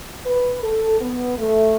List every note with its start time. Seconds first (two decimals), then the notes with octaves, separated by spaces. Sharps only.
0.25 B4
0.63 A4
1.00 B3
1.38 A3